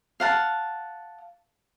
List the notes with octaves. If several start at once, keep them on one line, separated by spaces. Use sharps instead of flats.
F5 F#5 A5